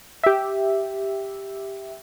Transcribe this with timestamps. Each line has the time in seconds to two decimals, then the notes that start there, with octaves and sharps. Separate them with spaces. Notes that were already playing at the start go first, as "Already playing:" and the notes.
0.23 G4 E5